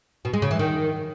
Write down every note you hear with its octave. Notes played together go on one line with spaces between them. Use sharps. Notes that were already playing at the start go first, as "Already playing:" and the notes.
B2
G#3
C#3
E3
D#3